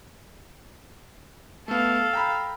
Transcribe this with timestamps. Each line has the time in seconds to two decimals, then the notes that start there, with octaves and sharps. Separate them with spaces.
1.68 A3 B3 A4 F5
2.13 G5 A#5 B5